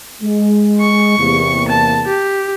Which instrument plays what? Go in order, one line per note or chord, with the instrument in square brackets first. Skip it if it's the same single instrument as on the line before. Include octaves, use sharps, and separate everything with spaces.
[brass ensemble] G#3
[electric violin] C#6
[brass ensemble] E2 C3 A#3
[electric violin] A5
G4